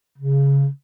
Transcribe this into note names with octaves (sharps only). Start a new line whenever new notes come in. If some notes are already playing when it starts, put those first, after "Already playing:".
C#3